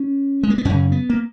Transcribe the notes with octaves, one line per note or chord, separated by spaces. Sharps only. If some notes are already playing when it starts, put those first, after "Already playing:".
Already playing: C#4
G#3
A#3
B3
F#2 C#3 C#4
B3
A#3